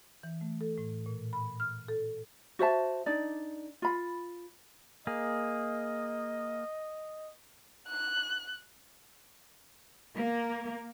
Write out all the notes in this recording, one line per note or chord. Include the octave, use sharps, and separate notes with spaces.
E3
A3
A4
A2
A#2
B5
F6
A4
F#4 C5 E5 A5
D4 D#4 D5
F4 B5
A#3 G#4 D#5
F#6
A#3